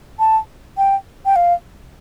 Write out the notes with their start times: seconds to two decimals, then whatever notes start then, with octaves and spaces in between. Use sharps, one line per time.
0.19 A5
0.78 G5
1.26 G5
1.36 F5